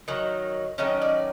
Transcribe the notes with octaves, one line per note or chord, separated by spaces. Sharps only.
D#3 F#3
D#3 F#3 A3 C#4 D#5
D5